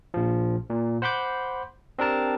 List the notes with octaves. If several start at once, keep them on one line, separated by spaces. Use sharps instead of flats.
A#1 F3
A#2
C5 F#5 B5 C6 D6 G6
C4 D4 G4 A#4 A5